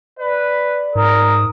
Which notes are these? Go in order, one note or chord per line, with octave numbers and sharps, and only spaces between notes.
B4 D5
G#2 A#4 D#6